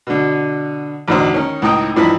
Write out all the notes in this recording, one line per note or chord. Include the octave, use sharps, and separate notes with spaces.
B2 D3
A1 E2 B2 D3 D#4 C5
D#3 C#4
C#2 A2 D#4 D#5 G5
G2 E3 F3 D#4 E4 B5